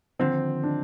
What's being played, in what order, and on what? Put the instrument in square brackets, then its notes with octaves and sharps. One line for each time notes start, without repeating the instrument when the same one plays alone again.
[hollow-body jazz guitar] D#2 D3 F3 [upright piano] C4
[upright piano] D4